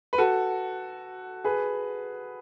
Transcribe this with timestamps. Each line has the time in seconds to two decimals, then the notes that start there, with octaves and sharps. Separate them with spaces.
0.13 B4
0.18 F#4 A4
1.44 G#4 B4